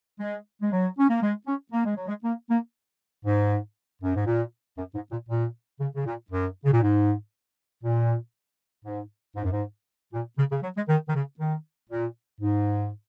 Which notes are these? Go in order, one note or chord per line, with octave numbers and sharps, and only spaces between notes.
G#3
G#3
F#3
C#4
A#3
G#3
C#4
A#3
G#3
F#3
G#3
A#3
A#3
G#2
F#2
G#2
A#2
F#2
G#2
A#2
A#2
C#3
C#3
A#2
F#2
C#3
A#2
G#2
A#2
G#2
G#2
F#2
G#2
A#2
C#3
C#3
F#3
G#3
D#3
D#3
C#3
D#3
A#2
G#2